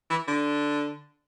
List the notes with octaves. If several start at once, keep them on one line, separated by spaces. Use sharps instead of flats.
E3
D3